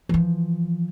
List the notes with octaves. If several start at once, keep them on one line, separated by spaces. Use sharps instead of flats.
E3 F3